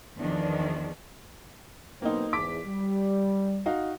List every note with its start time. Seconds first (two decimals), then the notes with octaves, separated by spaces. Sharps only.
0.17 E2 D#3 F3 D4
2.02 B1 B2 A#3 C4 D#4
2.33 E2 G#2 D6 B6 D7
2.66 G3
3.66 D#4 F#4 F5